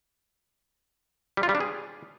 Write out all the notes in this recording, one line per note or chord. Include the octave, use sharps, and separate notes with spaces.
G3
F4
G3
D4
G#4